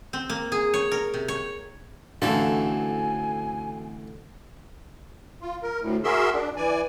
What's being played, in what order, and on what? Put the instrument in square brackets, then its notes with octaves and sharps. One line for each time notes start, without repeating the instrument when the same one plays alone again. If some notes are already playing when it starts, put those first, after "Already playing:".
[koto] C4
A#3
G#4
C#5
A#4
C3
C#5
[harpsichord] A1 E3 A4 [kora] D3 [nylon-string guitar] C4 F#4 F5 [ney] G#5
[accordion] F4
A#4
D2 A2
F#4 G#4 A#4 E5 C6 E6
D4
E3 D5 G#5